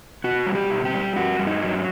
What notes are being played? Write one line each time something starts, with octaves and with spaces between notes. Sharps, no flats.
B2 F#4
G3
G4
B2
G4
G3
G2 F#4
G2
D#4
F#3